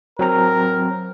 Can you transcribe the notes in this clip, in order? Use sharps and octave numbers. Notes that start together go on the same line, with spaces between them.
F#3 C4 A#4 A#5